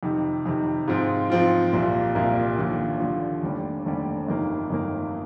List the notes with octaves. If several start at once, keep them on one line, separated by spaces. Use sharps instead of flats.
F2 C3 D#3
F2 C3 D#3
G#2 F3 C4 F4
G#2 F3 C4 F4
C2 A#2 F3 A#3
C2 A#2 F3 A#3
D#2 D3 F3
D#2 D3 F3
F1 D#2 D3 G3
F1 D#2 D3 G3
G1 F2 D#3 A#3
G1 F2 D#3 A#3